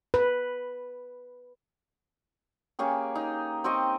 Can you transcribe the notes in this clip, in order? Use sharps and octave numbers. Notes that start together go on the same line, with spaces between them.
B4
A#3 C#4 G4 G#4
D#4
C4 G4 D#5 C#6